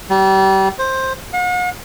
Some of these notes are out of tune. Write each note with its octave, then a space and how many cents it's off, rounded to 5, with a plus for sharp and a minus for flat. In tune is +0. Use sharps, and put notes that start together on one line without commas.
G3 -30
C5 +10
F#5 -45